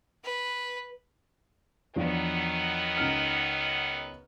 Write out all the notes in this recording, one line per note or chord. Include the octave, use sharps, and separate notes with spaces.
B4
E2 D#3 F3 F#3 B3 D4
C#2 D#4 F6